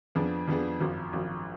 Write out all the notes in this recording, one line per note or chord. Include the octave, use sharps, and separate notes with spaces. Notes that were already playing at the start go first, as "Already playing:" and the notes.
F2 F3 B3 D4 G#4
F2 F3 B3 D4 G#4
G#1 F#2 F3
G#1 F#2 F3